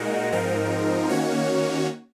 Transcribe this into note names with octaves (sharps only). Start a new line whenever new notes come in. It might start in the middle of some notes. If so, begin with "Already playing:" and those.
Already playing: A#2 G#3 D#4 F#4 A#4
G#2 F3 C4 D#4 A#4
D#3 A#3 C#4 F#4 C#5